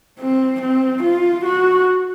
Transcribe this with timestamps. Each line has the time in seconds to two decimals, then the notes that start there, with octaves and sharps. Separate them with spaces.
0.19 C4
0.61 C4
1.03 F4
1.45 F#4